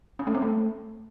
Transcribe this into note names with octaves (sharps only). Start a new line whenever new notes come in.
C#4
A3
C4
A3